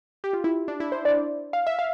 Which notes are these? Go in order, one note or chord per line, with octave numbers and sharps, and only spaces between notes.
G4
F4
E4
D4
E4
C5
D5
F5
E5
F5